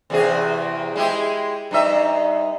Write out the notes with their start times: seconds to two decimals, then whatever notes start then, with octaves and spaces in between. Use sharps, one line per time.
0.10 E2 C3 G#4
0.96 G#3 E4 G4
1.71 G2 D#4 E5